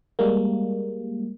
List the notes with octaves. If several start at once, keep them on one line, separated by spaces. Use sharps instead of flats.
G3 G#3 A#3